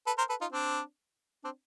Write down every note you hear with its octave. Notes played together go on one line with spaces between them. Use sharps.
A4 B4
A#4 C5
A4 B4
D#4 F4
C4 D4
C4 D4